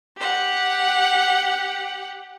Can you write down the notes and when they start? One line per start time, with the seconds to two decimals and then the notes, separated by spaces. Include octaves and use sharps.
0.18 G4 F#5